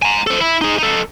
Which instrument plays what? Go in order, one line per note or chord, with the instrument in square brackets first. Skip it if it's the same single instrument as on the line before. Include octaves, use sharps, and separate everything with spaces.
[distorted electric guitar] G#5 A#5
A4 C5
E4
D#4 G#4
D#4 A4